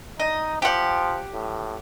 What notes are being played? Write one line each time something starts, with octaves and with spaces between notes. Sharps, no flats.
D#4 D#5
F3 G4 F#5
A2